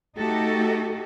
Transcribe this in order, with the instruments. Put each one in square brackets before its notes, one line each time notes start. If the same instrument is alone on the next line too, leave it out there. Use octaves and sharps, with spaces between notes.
[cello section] A3 D#4 F#4 G4 A4